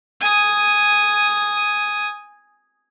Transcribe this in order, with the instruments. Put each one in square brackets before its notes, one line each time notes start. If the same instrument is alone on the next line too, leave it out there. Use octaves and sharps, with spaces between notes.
[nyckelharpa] G#5 D#6